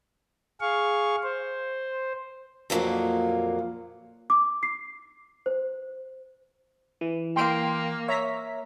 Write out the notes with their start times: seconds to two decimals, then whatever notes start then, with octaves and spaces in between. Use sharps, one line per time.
0.61 G#4 F5 C#6
1.23 C5
2.70 F2 A#2 E3 F#3 A#3
4.30 D6
4.63 C7
5.46 C5
7.01 E3
7.36 A#3 G5 C6 D7
8.08 C#5 E5 A#5 B6